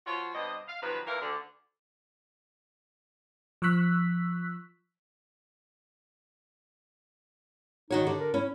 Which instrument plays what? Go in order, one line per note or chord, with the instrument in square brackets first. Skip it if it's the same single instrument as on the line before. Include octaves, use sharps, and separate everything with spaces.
[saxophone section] F3 F4 F#4 C#5
G2 B2 C4 D4 D#5
F5
C3 D#3 F3 F#3 B4
E2 A#2 E3 A#4 E5 F5
D2 D3
[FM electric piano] F3 C#6 E6 F#6 B6
[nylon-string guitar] D#3 F#4 C#5 [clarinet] D#4
[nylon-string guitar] D3 [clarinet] G4
[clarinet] A#4
[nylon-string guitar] C#4 [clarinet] E4